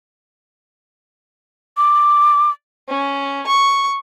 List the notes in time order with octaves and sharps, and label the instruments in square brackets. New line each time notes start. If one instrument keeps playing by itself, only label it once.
[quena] D6
[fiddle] C#4
C#6